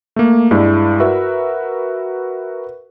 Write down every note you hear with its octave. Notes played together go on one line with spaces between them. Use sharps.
A3 A#3
G2 G#3 E4 D5
F#4 A#4 B4 E5